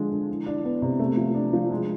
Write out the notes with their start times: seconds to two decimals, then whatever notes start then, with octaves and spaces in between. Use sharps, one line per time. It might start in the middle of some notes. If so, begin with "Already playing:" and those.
Already playing: D3 F3 G#3
0.11 D3
0.28 E3
0.46 D4
0.64 B3
0.82 C3
0.99 A3
1.17 F3
1.35 D4
1.53 F3
1.71 G#3